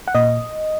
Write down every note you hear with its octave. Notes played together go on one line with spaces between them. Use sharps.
F#5
A#2 D#5